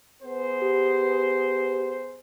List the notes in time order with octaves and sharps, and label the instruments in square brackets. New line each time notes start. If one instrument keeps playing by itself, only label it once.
[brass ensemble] B3 G#4 C5
[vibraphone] G4